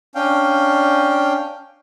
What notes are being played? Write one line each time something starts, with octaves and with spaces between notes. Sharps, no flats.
C#4 D4 F5 G5